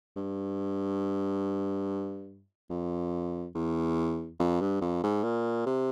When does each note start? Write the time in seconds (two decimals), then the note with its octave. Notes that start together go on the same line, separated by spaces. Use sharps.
0.16 G2
2.70 F2
3.55 E2
4.39 F2
4.61 G2
4.81 F2
5.04 G#2
5.24 A#2
5.66 C3